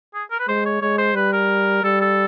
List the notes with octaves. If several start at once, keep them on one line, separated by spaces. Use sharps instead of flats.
G#4
A#4
B4
G#3 C5
C#5
G#3 C#5
C5
G3 B4
A#4
G3 A4
A4